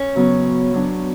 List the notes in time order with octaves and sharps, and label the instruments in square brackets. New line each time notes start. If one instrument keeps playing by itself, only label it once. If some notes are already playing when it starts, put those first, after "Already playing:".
Already playing: [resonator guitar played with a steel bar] C#4
[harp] C#3 F#3 B3
F#3 B3 D4